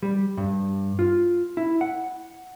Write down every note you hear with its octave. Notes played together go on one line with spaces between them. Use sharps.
G3
G2
F4
E4
F#5